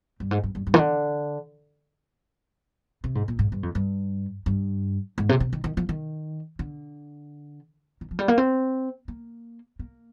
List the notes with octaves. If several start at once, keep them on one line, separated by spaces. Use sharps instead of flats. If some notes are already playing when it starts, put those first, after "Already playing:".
G2
G#2
G2
G2
G2
D#3
D3
C3
G#2
A#2
G#2
G2
F2
G2
G2
G#2
C3
C3
D#3
D#3
F3
D#3
D3
D#3
F3
G3
A#3
C4
A#3
A#3